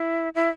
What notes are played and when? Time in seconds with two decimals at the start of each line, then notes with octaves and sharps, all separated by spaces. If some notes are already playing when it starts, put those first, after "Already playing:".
Already playing: E4
0.35 E4